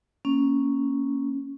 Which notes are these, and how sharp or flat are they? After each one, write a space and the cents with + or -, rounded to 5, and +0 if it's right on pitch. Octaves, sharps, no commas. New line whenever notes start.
A#3 +0 C#4 +0